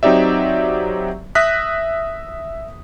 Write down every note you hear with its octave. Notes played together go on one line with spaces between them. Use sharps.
F#3 C4 D#4 G4 D5 E5
E5 D#6 F#6 A#6 B6